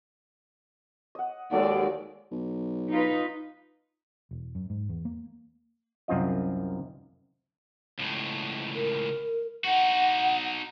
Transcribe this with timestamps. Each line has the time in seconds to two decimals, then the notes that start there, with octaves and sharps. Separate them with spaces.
1.15 D#5 F#5
1.51 D#2 F#3 G#3 A4 D5 F#5
2.31 B1
2.91 D#4 F4 B4
4.31 E1
4.55 F#2
4.70 G#2
4.89 E2
5.05 A#3
6.08 C2 F#2 C4 F4 D#5
7.99 C#2 A2
8.75 A#4
9.64 D#4 F#4 F#5